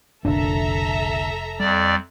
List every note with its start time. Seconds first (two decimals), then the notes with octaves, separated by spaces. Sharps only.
0.25 F1 B1 A#2 D3 D4 A4 E5 A#5
1.60 F2 G3 D5